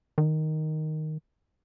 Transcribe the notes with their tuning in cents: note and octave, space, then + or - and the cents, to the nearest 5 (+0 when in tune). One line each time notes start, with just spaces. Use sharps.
D#3 +0